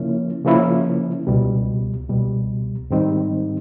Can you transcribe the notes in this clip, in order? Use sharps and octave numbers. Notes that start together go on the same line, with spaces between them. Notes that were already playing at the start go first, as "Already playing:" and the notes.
Already playing: C#3 F3 A#3 C#4 E4
C#3 F3 A#3 C#4 E4
C#2 B2 G3
C#2 B2 G3
G#2 D#3 G3 C4 D#4